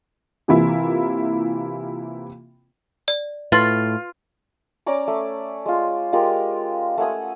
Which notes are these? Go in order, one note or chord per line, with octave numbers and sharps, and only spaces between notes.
C3 E3 A#3 E4 F4
D5
A2 F4 B4 A6
C#4 D5 A#5 D6
A3
G#3 F4
G#3 F4 G4 A#4
A3 F#5 G#5 D#6